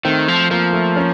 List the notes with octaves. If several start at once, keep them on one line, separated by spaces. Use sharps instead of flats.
D#3 A3 C4
F3
F3 A#3
A3
A#3 C#4